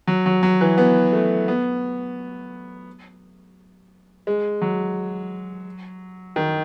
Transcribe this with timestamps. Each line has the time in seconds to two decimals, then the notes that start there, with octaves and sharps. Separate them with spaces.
0.07 F#3
0.26 F#3
0.43 F#3
0.61 E3
0.78 B3
1.13 A3
1.48 B3
4.27 G#3
4.62 F#3
6.36 D#3